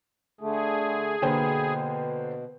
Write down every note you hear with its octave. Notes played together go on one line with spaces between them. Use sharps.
D3 A3 G#4
B2 D3 A#3 B4 C5 G5